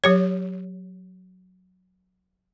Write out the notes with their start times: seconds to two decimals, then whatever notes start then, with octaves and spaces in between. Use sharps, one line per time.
0.04 F#3 G4 C#5